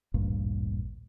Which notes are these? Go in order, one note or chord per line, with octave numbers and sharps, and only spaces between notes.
A1 D2 G2 A#2